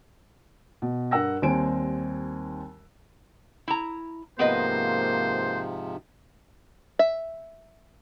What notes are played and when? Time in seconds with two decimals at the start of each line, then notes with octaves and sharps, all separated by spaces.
0.82 B2
1.11 G2 A#4 F#5 E6 A#6
1.42 D#2 G3 C4 G#5 D7
3.68 E4 A#5
4.39 G#2 C3 F3 A#3 B3 B4 C5 D#5
6.99 E5